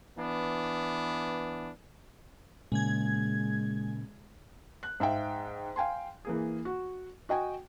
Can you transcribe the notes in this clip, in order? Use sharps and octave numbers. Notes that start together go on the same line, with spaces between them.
E3 B3 D4
A#2 C#3 G#3 G#6
F#6
G#2 E5 F5 G5
F5 G5 G#5 C6
E3 A#3 G#4
F#4
F#4 D#5 G5 G#5